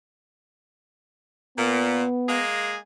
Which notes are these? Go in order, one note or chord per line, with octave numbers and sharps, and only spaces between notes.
A#2 B3
G#3 A#3 G#4